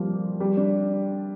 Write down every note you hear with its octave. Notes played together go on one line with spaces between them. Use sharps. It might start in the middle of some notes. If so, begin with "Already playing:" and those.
Already playing: F3 G3 A#3
G3
D4